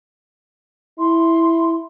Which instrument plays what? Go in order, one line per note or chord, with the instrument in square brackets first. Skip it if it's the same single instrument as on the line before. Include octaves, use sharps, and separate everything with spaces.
[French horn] E4 [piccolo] C6